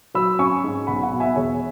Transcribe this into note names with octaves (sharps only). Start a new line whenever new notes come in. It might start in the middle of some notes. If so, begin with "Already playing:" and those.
F#3 B5 E6
C#4 G#5 C#6
G#2
B1 F#5 B5
F#5 B5
B2
E5 G#5
E1 G#4 C#5